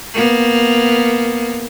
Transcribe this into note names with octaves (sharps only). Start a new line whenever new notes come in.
A#3 B3